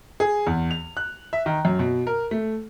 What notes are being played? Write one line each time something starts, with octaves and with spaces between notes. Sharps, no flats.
G#4
E2
F7
F#6
E5
D#3
F#2
B2
A#4
A3